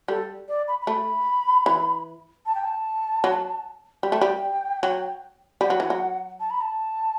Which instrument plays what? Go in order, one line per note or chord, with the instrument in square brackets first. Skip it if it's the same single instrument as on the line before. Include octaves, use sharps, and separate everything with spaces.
[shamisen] G3 [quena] A4
[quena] D5
B5
B5
[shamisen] A3
E3
[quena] A5
G5
A5
[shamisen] F#3
[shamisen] G3 [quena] G5
[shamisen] A3
G3
F#3
[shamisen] G3 [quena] F#5
[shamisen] F#3
E3
F#3
[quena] A5
B5
A5